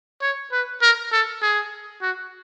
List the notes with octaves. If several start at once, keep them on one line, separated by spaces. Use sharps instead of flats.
C#5
B4
A#4
A4
G#4
F#4